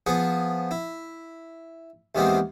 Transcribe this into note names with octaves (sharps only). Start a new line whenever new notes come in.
F3 B3 G#4 C#6
E4
D#2 D#3 E3 G#3 B3 C4